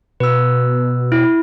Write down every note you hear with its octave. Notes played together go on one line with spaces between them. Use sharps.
B2 B4 E6
E4